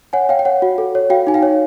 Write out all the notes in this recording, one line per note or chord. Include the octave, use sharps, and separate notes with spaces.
C#5 F#5 G#5
C#5 F5 G5
G5
C#5 F#5
F#4
A4
C#5
F#4 F5 G5
D#4 G#5
F5 G5
C#5